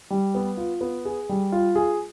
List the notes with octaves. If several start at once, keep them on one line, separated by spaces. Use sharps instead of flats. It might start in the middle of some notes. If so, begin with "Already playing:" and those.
G3
B3
F4
B3
G#4
G3
F4
G#4